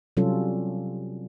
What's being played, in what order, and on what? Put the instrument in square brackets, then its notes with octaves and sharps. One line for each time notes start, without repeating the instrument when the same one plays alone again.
[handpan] C3 F#3 G3 C#4 F4 A4